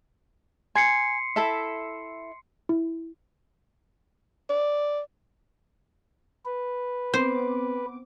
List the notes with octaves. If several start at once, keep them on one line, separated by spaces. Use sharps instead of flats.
G#5 C6 C7 C#7
E4 A4 E5
E4
D5
B4
B3 C4 C5 D6